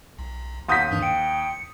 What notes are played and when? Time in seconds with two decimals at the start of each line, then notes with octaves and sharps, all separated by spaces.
0.19 B1
0.68 D#2 F5 F#5 C6 D#6 G6 B6
0.91 G2 E3 D4
1.02 G5 C#7